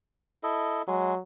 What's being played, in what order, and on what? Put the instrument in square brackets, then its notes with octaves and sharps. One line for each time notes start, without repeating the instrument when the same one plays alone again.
[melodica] E4 A4 D#5
[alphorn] F#3 [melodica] G#3